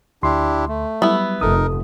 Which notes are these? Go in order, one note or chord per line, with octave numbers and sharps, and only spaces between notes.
D2 D4 E4 G4 C6
A3
F#3 G3 B3 E4
F1 D#4 A4 A#4 D#6